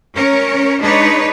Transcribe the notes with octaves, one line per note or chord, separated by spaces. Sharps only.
C#4 A#4 C#5
G#3 D4 D#4 B4 C#5